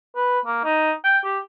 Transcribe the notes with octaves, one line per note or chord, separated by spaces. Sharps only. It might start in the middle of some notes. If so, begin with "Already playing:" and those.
B4
A#3
D#4
G5
G4